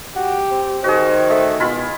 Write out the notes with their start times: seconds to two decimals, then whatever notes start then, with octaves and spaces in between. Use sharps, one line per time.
0.16 F#4 G4
0.51 C4
0.84 D#3 F#4 G#4 C5
1.30 A3
1.60 B2 G#3 E4 F4 B5